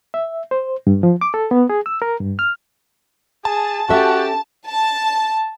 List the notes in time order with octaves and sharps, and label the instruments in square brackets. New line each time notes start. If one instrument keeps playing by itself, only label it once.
[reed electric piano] E5
C5
G2
F3
D6
A4
B3
G#4
E6
A#4
G2
F6
[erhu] G#4 [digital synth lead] A5
[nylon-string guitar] C#4 A4 E5 [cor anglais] F#4 [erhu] G4
[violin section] A5